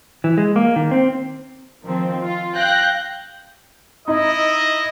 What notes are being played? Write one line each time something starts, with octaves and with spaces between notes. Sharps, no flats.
E3
G#3
A#3
D#3
C4
D#3 F3 C4
F4
F5 G5 F#6 G6 A#6
D#4 E4 D#5